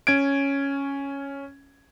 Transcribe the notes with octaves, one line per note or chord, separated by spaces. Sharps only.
C#4 G#6 D7